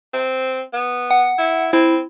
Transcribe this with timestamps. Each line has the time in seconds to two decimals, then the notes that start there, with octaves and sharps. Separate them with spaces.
0.13 C4
0.73 B3
1.11 F#5
1.39 E4
1.73 C4 E4